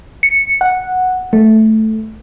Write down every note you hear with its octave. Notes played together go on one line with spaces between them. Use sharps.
C#7
F#5
A3